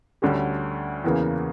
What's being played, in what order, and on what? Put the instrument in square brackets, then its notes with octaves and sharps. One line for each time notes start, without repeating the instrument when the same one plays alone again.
[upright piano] D2 D3 G3 C#4 G4
E2 C#3 E3 A#3